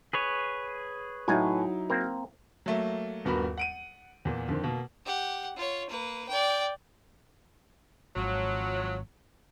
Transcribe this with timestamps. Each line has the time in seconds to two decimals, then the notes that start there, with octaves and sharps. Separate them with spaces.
0.13 G#4 B4 C#5
1.28 A2 F#3 D#4 E4 G#5
1.90 A#3 C4 A#4
2.66 F#3 A3 A#3
3.25 D#1 G2 B3 F#4 A#4 B5
3.58 F#5 D7 D#7
4.25 E2 A#2
4.49 F2 D3 D#3 C4
4.64 B2 A#3
5.05 G4 F#5
5.56 F4 C#5
5.89 A#3 B4
6.28 D5 G5
8.16 G#1 F3 F#3